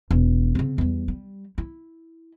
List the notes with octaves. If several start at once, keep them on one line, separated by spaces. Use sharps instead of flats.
E1
C#3 C4
E2 G3
G3
E4